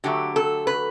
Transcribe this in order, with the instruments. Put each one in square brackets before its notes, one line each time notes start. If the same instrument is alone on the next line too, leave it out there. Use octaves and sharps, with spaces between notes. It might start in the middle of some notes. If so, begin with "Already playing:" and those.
[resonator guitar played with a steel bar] D3 F#3 A3 G4
A4
B4